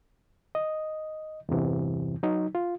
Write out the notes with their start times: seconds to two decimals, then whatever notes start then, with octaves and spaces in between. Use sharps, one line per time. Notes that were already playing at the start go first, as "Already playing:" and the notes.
0.55 D#5
1.49 E2 G2 C3 E3
2.23 F#3 D#4
2.55 F4